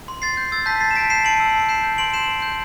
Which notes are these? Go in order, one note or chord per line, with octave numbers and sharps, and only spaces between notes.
C6
C6 A6 C7
G6
E6 A6
A5 G6 B6
A5 A6 C7
E7
A5 B6 D7
G6 C7 E7
A5 D7 F#7
E6
A5
G6 C7 E7
G6
C6 D7 F#7
G6 C7 E7
C6
G6